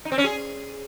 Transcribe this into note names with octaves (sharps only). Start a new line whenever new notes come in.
D#4
C4
C#4
G#4